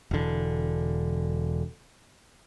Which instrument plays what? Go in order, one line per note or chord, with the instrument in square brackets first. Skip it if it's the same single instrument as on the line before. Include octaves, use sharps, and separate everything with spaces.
[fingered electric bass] E1 D3